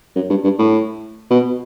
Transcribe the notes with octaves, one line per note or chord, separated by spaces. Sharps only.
F#2
G2
G2
A2
B2